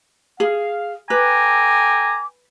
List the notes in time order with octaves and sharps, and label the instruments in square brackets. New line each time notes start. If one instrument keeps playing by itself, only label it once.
[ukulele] G#4 [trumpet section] F5
[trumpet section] A4 G5 G#5 [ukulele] B4 [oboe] A#5 [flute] D6